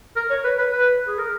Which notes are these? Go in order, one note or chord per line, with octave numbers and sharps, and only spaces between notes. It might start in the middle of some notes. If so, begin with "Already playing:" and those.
A#4
C#5
B4
B4
B4
G#4
A#4